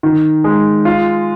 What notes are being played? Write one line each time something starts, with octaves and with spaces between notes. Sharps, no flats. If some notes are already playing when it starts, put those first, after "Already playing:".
D#3
G#3
F4